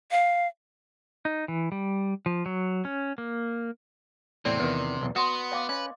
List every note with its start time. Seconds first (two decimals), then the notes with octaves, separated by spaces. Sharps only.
0.11 F5
1.25 D#4
1.48 E3
1.72 G3
2.26 F3
2.46 F#3
2.85 C#4
3.18 A#3
4.45 E2 A2 C3 C4 D5
4.59 E2 D#3 B4
5.01 B1 E2
5.16 B3 F#4 C6 D#6
5.52 D#5 F5 D6
5.69 C#4 B4 D#5